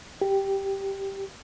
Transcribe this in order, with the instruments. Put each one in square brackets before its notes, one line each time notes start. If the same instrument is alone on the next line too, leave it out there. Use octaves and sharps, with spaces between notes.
[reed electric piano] G4